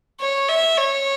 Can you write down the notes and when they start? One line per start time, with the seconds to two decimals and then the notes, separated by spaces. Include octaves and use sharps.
0.20 C#5
0.49 E5
0.78 C#5